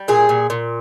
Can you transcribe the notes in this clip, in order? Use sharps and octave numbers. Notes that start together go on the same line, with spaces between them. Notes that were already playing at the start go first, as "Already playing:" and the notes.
Already playing: G3
A#2 G#4
A#2
A#2